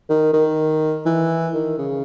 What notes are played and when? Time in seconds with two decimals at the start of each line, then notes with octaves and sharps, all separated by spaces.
0.09 D#3
0.33 D#3
1.06 E3
1.54 D#3
1.79 C#3